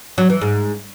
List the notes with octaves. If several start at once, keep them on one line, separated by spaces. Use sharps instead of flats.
F#3
E3
G#2